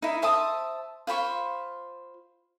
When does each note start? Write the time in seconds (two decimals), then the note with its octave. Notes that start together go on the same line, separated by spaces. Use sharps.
0.02 D#4 E4
0.22 C5 E5 A5 D#6
1.07 F4 C5 B5 C#6